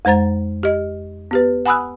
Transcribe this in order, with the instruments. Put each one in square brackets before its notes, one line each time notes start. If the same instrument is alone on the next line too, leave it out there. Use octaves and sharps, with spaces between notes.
[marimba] F2 G#3 C5 A#5 A6
G4 D#5
B3 G4 B4
F#5 G#5 B5 D#6 E6 F#6